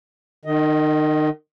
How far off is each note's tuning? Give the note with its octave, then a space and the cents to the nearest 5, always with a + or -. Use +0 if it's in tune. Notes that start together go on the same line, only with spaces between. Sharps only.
D#3 -30 D#5 +10